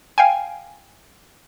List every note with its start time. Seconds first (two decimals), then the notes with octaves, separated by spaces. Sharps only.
0.18 F5 G5 G#5